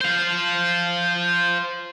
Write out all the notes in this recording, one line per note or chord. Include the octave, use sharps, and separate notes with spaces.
C5 F5